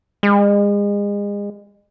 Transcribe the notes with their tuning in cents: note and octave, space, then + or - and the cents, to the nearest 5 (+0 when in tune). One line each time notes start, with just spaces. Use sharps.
G#3 -35